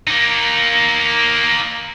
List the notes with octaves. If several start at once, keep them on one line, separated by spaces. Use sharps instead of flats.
A#3 D#4